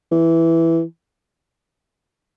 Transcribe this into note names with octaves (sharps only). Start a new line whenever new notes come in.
E3